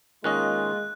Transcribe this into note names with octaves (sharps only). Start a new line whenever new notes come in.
D#3 G#3 A#3 C#4 F4 D#5 F#6